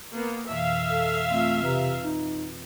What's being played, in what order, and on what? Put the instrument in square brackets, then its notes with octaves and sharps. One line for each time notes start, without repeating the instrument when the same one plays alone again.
[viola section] A#3 B3
[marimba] F2 B2 E3 [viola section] E5 F5
[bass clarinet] A4
[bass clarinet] A3 [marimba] C4 F4
[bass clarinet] C3 [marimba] B4 A#5
[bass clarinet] D#4